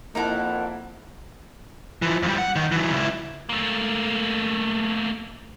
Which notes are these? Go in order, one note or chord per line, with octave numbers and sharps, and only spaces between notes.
F2 A#3 D#4 E4 A#4 F#5 A5
E3 F3
F2 G3
F#5
D#2 D#3
E3 F#3
C#2 E4
A3 A#3